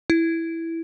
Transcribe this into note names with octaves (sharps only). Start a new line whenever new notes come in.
E4